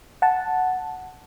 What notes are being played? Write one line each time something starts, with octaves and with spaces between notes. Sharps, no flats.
F#5 A5